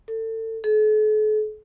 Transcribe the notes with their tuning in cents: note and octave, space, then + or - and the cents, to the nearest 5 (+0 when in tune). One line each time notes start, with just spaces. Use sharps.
A4 +30
A4 -45